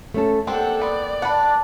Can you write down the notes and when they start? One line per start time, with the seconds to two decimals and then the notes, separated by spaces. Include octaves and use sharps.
0.14 A3 C#4 A4
0.47 A#3 C4 D4 G4 A4 F#5
0.82 B3 C4 D5
1.22 D4 B4 F#5